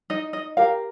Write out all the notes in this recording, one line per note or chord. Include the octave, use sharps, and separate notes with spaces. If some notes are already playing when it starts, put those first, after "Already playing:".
D#4 D#5
D#5
G4 A#4 F5